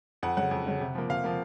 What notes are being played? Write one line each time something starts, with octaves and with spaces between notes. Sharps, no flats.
F2 F#5
C#3 F#3 F#5
F2
C#3 F#3
C3
F3 A#3
C3 F5
F3 A#3